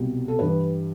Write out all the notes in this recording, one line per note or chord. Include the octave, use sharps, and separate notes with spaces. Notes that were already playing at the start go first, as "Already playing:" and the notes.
Already playing: C2 B2 G3
A4
G2 E3 G3 B4